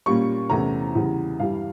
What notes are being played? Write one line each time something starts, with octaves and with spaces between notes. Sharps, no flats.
A#2 G3 A#3 C#4 C#6
E2 C3 E3 A3 C#4 A#5
E2 C#3 E3 G3
G2 E3 G3 F5